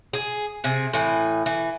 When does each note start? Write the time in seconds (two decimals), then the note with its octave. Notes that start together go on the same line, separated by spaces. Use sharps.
0.13 G#4
0.64 C3 G#4
0.94 A2 E3
1.46 E3